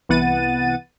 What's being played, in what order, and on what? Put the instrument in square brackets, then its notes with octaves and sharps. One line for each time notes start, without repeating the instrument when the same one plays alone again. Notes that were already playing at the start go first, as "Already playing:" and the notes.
[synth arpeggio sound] C2 E3 B3 F#5 A6 D#7